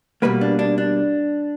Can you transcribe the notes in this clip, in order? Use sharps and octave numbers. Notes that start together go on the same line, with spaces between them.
B2 G3 A#3 B4
D4
D4
D4